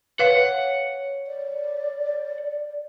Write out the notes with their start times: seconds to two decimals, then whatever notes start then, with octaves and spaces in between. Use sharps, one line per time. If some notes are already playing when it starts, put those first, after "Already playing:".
0.19 B4 C#5 F5 F#5
1.27 D5